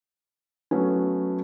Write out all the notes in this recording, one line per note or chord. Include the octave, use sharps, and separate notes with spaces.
F#3 A3 B3 C#4